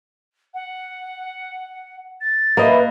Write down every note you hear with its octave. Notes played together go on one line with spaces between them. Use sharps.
F#5
A6
A#3 B4 D#5 E5